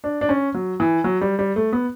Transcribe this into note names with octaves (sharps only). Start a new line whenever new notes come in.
D4
D4
C#4
F#3
E3
F#3
G3
G3
A3
B3